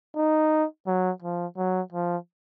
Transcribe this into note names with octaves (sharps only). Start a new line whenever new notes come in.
D#4
F#3
F3
F#3
F3